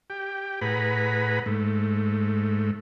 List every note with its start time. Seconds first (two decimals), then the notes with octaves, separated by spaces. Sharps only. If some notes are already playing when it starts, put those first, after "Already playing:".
0.10 G4 G5
0.61 A2 G#4 B4 F#5 A#5 B5
1.46 G#2 A3